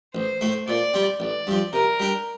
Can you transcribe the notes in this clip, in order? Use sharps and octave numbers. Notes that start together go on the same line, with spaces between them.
A1 C5
A2 A3
A#2 D5
G3 C4
A1 D5
G2 F3
C3 A#4
G3 D4